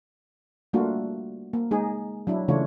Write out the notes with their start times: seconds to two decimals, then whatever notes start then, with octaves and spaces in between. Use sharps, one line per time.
0.73 G3 A3 A#3 D4 F4 F#4
1.53 A#3
1.71 G#3 D#4 G#4
2.27 F#3 D4 E4
2.48 C#3 E3 A3 D4 F4 C#5